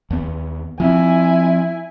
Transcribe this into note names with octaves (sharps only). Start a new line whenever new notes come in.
D#2 B3
F3 C4 E4 G#5